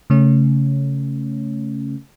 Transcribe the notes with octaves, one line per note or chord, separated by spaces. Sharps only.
C#3 A3 C#4